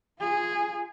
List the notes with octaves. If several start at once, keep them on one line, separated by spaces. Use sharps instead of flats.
F4 G#4